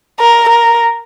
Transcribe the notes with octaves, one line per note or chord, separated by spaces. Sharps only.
A#4
A#4